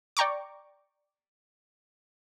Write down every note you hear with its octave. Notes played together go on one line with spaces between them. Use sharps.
D5 G5 A#5 C#6 D6